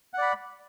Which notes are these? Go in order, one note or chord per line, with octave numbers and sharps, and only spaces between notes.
D5 F#5 B5